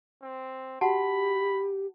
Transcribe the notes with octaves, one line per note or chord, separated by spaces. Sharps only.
C4
F#4 G4 F#5 A5 B5